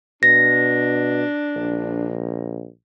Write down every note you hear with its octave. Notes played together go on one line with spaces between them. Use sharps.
B2 D4 A#6
A#1